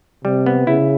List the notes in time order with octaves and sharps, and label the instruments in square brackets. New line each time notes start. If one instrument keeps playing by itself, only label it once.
[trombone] C3 [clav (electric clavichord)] G3
[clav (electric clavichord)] B3
[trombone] C#3 [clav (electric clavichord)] E4